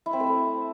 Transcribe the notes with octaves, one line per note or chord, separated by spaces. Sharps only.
E4
C4
A3